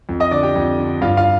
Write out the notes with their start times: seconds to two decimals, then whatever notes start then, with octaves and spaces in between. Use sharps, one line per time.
0.09 F2
0.20 D#5 D#6
0.31 D3 D5 D6
0.43 G4 G5
0.56 F2
0.79 D3
1.01 G2 F4 F5
1.17 F4 F5